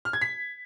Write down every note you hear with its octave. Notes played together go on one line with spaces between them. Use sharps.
F6
G#6
B6